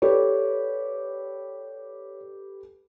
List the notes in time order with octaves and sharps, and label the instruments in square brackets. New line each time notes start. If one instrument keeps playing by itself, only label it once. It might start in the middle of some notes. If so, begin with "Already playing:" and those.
[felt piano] G4 A4 B4 [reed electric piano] C#5 D5